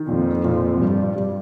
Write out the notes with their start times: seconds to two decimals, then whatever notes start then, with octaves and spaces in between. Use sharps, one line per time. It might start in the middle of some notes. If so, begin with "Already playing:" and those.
Already playing: D#3
0.09 F2 A#2
0.44 A#2
0.80 G2 G3
1.16 G3